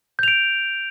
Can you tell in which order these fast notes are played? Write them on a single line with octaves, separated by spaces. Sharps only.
G6 F7 D7